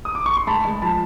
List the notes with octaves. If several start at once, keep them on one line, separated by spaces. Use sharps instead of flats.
D#6
D6
C#6
C6
G#3 A5 B5
G#3
F3 A5 B5